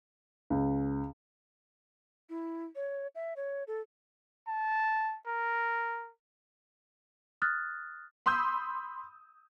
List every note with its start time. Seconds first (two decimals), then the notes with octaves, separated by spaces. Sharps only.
0.50 C#2
2.30 E4
2.76 C#5
3.15 E5
3.36 C#5
3.67 A4
4.48 A5
5.27 A#4
7.42 D#6 F6 F#6 A6
8.26 B5 C6 D#6 E6 G6